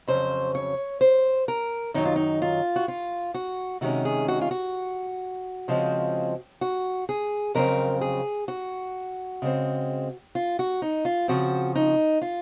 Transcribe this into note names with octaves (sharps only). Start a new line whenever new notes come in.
F2 C#3 F#3 C#4 C5
C#5
C5
A#4
F#2 D#3 F#3 D#4
F4
D#4
F4
F#4
F4
F#4
C3 D#3 G#3 C#4 F#4
G#4
F#4
F4
F#4
C#3 F3 G#3 C4
F#4
G#4
F2 C#3 F#3 C4 A#4
G#4
F#4
C#3 G#3 C4
F4
F#4
D#4
F4
C#3 F3 C4 F#4
D#4
F4